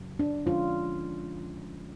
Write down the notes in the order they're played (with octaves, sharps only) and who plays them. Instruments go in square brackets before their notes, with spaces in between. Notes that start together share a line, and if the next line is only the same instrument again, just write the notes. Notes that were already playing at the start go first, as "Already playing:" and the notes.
Already playing: [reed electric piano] F#2 C#3 F#3
[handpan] D4
[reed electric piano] F2 D3 F3 G#3 C#4 [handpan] F4